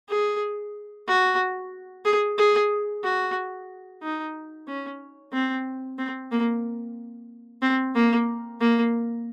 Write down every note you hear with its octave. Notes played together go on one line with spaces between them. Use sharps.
G#4
F#4
G#4
G#4
F#4
D#4
C#4
C4
C4
A#3
C4
A#3
A#3